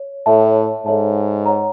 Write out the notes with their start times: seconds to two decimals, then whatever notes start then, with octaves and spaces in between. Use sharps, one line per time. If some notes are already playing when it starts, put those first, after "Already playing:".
Already playing: C#5
0.26 A2 A4 C#5 E5 A5
0.86 G#2 A4 C#5 E5 A5
1.46 C#5 F#5 A#5